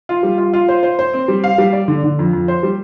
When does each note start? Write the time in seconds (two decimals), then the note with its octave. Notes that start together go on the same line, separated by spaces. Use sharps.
0.09 F4
0.23 G3
0.38 F4
0.54 F4
0.68 C5
0.83 C5
0.99 C5
1.13 C4
1.28 G3
1.44 F5
1.58 G3
1.73 D5
1.88 D3
2.03 D3
2.19 F2
2.33 F2
2.48 C5
2.63 G3